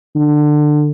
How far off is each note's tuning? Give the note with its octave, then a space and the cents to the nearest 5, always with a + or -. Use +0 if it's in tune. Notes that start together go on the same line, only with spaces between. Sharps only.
D3 +25